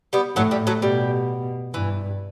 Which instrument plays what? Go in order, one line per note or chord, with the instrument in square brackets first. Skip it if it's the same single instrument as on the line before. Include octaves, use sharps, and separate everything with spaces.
[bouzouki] G3 B3
[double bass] A2 [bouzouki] F#3 A3
[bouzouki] G3
F#3 A3
[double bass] B2 [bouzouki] G3
[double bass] G2 [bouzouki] E3